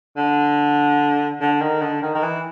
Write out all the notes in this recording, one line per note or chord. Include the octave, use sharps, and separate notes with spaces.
D3
D3
D#3
D3
D#3
D#3
E3